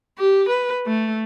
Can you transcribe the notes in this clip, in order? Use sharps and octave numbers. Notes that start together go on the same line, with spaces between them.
G4
B4
A3